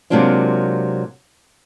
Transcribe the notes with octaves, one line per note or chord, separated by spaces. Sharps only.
C3 F#3 G#3 A#3 D4 F4